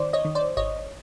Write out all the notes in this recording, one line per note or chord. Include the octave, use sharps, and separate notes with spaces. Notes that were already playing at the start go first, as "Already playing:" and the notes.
Already playing: D#3 C5 D5
C#5 D#5
D#3
C5 D5
G#1 C#5 D#5